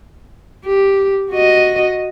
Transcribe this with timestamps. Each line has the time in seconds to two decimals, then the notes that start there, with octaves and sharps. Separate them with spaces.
0.65 G4
1.31 F#4 D#5